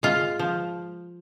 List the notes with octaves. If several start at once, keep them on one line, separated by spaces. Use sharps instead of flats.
G#3 F4
F3